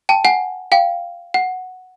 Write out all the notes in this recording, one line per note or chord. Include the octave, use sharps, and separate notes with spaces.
G5 A5
F#5 G#5
F5 G5
F#5